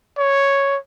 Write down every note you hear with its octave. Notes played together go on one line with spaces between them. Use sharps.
C#5